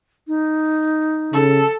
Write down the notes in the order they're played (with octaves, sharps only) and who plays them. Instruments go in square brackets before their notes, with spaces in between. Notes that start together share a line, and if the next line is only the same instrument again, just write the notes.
[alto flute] D#4
[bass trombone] C#3 [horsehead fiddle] A4